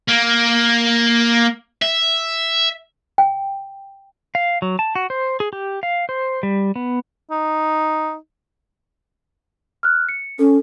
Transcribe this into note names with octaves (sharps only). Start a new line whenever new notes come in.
A#3
E5
G5
F5
F#3
A5
F#4
C5
G#4
G4
F5
C5
G3
B3
D#4
F6 F#6
C#7
C#4 A4